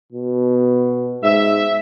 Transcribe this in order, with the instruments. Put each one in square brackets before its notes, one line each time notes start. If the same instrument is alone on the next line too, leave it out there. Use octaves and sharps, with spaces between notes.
[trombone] B2
[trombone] G#2 [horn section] E5